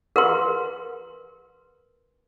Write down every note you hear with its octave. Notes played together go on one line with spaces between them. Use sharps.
A#4 B4 C6